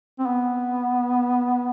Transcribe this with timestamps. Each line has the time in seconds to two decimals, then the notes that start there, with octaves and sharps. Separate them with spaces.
0.19 C4
0.27 B3